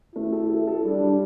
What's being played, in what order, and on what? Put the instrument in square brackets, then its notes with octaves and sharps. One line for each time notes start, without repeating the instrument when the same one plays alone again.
[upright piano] A3 [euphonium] E4
[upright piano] A4
A4
A4
[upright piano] G3 [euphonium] D4
[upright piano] G3